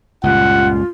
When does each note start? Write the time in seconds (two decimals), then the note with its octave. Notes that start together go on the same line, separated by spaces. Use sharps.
0.23 C#2 G2 A#2 F4 F#5